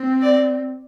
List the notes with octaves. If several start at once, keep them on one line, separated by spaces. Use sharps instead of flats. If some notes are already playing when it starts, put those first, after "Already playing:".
Already playing: C4
D5